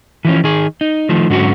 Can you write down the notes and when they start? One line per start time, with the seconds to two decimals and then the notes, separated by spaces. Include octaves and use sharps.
0.25 E3 F3 C#4
0.44 D#3 G#4
0.81 D#4
1.09 D#3 F3 A3
1.30 G#2 D3 F#3 C#4 F#4